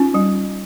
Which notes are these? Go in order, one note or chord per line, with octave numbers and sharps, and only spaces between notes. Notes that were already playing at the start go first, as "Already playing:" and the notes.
Already playing: C#4 D#4 F4
G3